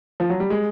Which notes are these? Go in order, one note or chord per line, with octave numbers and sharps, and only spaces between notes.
F3
F#3
G3
G#3